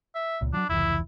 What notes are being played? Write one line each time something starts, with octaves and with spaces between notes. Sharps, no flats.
E5
C#2 A#2
F3 F#3 D4
F1 C#2 E3 E4